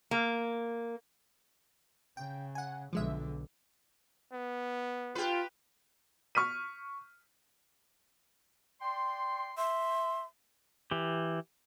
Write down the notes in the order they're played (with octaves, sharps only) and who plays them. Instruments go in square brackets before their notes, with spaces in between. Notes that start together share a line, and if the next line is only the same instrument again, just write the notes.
[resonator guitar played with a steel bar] A#3
[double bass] C#3 [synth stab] G5
[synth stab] F#5 G#5
[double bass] B1 D3 [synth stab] F3 G#3 E5
[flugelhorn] B3
[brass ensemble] F4 [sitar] G4 B4
[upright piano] C#6 F6 B6 D#7
[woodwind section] D5 G5 C6
[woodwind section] E5 [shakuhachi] C6
[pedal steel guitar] E3 G4